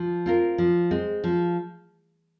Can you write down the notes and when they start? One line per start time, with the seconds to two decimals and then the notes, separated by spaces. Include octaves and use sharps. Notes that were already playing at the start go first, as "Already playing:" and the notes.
Already playing: F3
0.26 C4 F4 A#4
0.58 F3
0.91 G#3 C4
1.24 F3